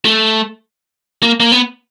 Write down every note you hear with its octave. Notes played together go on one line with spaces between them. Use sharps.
A3
A#3
A#3
B3